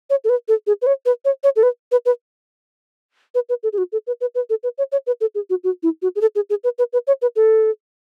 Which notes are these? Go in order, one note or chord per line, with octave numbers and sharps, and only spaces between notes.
C#5
A4
B4
A4
G#4
B4
C#5
B4
C#5
C#5
A4
B4
B4
B4
B4
B4
A4
G#4
F#4
A4
B4
B4
B4
A4
B4
C#5
C#5
B4
A4
G#4
F#4
F#4
E4
F#4
G#4
A4
G#4
G#4
B4
B4
B4
C#5
B4
A4